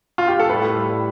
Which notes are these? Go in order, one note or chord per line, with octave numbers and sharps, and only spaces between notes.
F4
G4
A4
A2 G3 B4